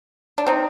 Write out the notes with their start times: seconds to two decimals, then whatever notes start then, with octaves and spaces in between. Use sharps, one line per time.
0.38 D4
0.47 C4 D#4